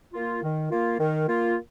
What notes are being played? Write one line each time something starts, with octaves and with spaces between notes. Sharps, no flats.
A#3 F4
D#3
A#3 F4
D#3
A#3 F4